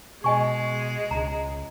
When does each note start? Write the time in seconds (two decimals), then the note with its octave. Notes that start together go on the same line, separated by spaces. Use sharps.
0.24 B2 G#3 D#5 G#5 C#6
1.11 C#2 A#5